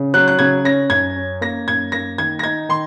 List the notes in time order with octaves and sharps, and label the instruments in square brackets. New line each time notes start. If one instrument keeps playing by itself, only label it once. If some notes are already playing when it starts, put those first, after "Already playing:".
Already playing: [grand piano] C#3
[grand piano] F#3 [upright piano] F#6
[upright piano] F#6
[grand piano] C#3 [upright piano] G#6
[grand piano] C#4 [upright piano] A#6
[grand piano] F#2 [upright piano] G#6
[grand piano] C#4
[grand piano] A#3 [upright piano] A#6
[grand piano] F#2 [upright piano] G#6
[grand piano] A#3 [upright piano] A#6
[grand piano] D#3 [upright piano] G#6
[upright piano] A#6
[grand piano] D#4 [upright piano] G#6
[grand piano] D#3 [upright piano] C6